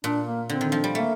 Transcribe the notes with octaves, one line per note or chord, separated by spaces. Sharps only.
A#2 D4
A#3
D3 C4
D#3
F3
G3
A3 A#3